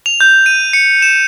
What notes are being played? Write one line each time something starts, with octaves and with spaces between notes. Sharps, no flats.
F7
G6
D#7
C#7
E7